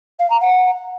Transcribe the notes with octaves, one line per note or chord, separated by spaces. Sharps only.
F5
A#5
F#5